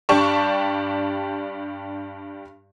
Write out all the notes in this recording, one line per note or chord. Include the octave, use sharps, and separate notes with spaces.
G2 D4 G4 A5 C#6